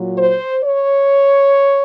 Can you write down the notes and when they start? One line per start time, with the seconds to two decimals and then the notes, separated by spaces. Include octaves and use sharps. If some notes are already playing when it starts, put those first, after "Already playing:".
Already playing: A#2 F#3
0.18 C5
0.64 C#5